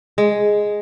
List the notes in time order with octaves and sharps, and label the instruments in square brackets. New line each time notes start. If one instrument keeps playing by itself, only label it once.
[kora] G#3